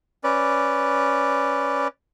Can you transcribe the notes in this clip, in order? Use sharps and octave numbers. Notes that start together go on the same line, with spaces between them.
C#4 B4 D5